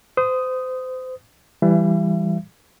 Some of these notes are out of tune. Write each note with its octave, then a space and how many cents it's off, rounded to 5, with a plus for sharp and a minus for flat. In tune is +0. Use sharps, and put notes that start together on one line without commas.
C5 -30 D#6 +0
E3 +20 G3 +15 E5 +40